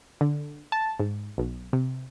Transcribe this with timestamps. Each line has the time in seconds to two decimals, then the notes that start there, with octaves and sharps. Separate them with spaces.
0.21 D3
0.72 A5
0.99 G#2
1.38 B1
1.73 C3